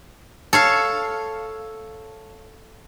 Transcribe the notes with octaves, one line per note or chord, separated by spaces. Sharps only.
A4 C#5 F5